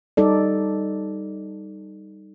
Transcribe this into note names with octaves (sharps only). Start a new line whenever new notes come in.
G3 D#4 A4 D5